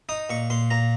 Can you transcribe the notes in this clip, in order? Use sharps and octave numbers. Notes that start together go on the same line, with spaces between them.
D#4 D#6
A#2 C#6
A#2 C6
A#2 A#5